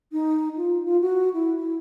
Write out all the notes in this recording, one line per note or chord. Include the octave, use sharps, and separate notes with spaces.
D#4
F4
F4
F#4
E4
E4